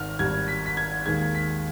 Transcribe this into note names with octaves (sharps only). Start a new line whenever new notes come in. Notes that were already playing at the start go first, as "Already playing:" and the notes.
Already playing: G#1 G#2 D#3 F6
G#1 G#2 D#3 G3 G#6
B6
B6
G#6
D#2 D#3 G#3 G#6
B6